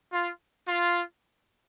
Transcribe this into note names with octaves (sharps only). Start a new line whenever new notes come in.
F4
F4